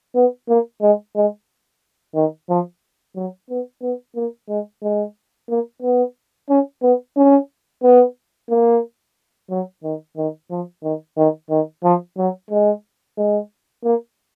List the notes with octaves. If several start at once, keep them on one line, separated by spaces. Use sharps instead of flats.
B3
A#3
G#3
G#3
D#3
F3
F#3
B3
B3
A#3
G#3
G#3
A#3
B3
C#4
B3
C#4
B3
A#3
F#3
D#3
D#3
F3
D#3
D#3
D#3
F3
F#3
G#3
G#3
A#3